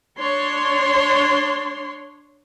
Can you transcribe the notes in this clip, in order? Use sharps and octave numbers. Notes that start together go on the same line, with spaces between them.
D4 C#5 C6